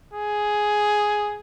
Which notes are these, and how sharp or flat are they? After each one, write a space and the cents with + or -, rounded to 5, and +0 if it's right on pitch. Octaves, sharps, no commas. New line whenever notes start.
G#4 +5